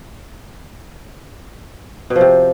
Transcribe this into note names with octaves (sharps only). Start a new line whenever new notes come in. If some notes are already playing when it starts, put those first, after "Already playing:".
B2
F3
C3